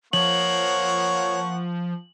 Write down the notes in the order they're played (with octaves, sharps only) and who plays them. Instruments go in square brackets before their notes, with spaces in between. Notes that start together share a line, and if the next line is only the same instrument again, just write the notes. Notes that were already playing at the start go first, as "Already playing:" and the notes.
[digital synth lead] F3 [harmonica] A#3 F#5 C#6 [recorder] C#5 [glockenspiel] F#7